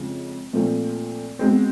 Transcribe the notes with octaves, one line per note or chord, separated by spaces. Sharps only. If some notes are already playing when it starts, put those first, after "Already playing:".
Already playing: F2 C#3 F3 G#3
A#2 F3 A3 C4
B2 G#3 C4